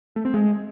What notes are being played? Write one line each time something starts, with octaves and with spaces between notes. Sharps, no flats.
A3
C4
G#3